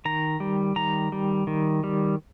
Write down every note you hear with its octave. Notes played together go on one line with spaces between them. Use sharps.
D#3 A#5
G3
D#3 A#5
G3
D#3
G3